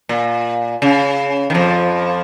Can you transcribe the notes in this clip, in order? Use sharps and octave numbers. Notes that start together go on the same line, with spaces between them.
A#2
C#3
D#3
F2 F3